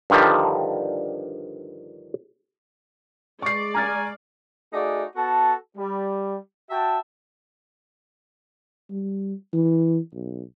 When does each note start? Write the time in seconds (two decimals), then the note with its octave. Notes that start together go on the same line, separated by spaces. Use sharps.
0.10 G2 D3 D#3 F3 G3
3.42 G#3 D5 C#6 C7
3.75 G#5 A#5 F6 A6
4.73 A3 D#4 F#4 G#4 D5
5.16 B3 F#4 A4 A5
5.77 G3
6.70 F#4 E5 G5 A5
8.90 G3
9.54 E3
10.13 B1